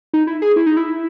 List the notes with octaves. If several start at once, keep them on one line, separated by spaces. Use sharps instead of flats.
D#4
E4
G#4
E4
D#4
E4